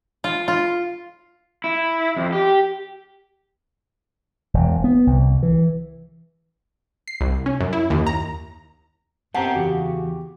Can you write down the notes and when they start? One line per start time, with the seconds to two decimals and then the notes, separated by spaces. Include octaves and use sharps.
0.24 F4
0.48 F4
1.64 E4
2.16 F2
2.33 G4
4.54 E1
4.84 B3
5.07 C2
5.43 E3
7.08 C7
7.21 C2
7.46 C#4
7.61 F#2
7.73 E4
7.90 D#2
8.07 A#5
9.34 F#2 B3 C4 G4 F#5 A5 A#5
9.56 E2 C#3 F#4 G4